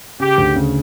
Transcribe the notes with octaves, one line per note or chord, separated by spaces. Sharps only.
C#3 G4
D2
C#3